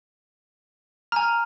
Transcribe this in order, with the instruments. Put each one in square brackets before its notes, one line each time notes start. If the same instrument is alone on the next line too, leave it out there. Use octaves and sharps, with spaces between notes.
[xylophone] G#5 A#5 [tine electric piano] F6